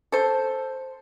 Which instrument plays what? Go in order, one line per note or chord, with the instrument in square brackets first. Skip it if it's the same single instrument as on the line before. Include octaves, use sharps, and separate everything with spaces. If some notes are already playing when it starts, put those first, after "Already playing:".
[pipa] A4 C5